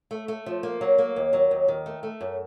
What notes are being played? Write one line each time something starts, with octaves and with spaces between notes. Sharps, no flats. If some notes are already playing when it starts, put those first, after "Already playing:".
A3
A3
F3
A#3
F#3
A#3
D#2
F#3
D#2
D#3
A3
A3
F#2